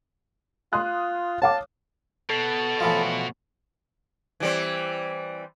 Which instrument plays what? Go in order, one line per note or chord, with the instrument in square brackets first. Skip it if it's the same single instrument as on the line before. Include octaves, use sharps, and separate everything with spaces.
[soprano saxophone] F4 [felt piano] C6 D#6 F#6
[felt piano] C#5 F5 D6 [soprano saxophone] A5
[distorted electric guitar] B2 [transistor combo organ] A4
[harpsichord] A2 E3 F3
[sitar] E3 G3 C4